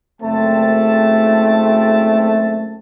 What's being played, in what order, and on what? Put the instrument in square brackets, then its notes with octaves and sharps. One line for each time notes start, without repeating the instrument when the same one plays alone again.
[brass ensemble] F#1 C4 A5 [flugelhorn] A3